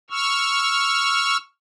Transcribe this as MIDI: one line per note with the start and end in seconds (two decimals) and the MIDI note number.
0.10 1.37 85
0.10 1.37 88
0.10 1.37 89